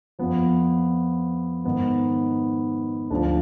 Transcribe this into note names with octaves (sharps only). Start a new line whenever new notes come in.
F2 F3 B3
G#2 D#3 B3
D2 D3 F3 D4